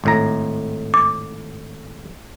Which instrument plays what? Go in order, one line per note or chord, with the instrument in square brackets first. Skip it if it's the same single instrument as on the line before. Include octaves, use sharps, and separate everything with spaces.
[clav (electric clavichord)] G#1 A2 A#5
[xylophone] D6